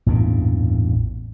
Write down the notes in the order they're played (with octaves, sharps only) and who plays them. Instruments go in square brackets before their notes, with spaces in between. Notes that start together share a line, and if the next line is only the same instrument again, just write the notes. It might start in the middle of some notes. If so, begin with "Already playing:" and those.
[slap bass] A1 E2 G2 A#2